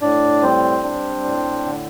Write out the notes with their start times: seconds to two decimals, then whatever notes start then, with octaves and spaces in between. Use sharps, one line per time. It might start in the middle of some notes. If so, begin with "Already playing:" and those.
0.01 A2 D4 D5
0.43 G3 C4 C5
0.83 D4
1.24 A2
1.65 D3